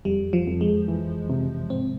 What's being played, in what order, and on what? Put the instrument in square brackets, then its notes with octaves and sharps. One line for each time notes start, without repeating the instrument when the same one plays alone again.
[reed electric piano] F2 [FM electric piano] G3
[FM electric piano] F3
[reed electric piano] F2
[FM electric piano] G#3
[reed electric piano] E3
C3
[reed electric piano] G#2 [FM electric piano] C4